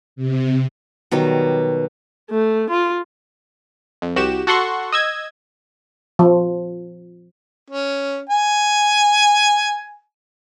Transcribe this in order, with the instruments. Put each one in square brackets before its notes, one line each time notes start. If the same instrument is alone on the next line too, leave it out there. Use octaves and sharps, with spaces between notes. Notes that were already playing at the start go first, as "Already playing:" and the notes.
[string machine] C3
[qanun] B2 D#3 F#3 G3
[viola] A3
F4
[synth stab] F2
C2 F#4 G4 E7
F#4 A4 F#5 C6 C#6
D#5 E6 G#6
[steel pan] F3
[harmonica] C#4
G#5